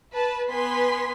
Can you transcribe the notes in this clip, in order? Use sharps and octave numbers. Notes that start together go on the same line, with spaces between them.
B4 A5
B3 B4 G#5 C6 B6